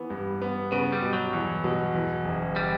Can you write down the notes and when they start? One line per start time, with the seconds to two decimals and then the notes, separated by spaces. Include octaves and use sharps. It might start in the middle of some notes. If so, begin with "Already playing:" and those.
Already playing: E3 B3
0.10 G2
0.42 B3
0.72 C#3 B3
0.92 G3
1.02 B2
1.13 F#3
1.33 E2
1.64 B2
1.95 E2
2.25 F#1
2.56 G3